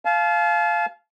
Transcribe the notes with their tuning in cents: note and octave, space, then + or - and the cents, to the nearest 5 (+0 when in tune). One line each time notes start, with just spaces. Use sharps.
F5 -10 A5 -40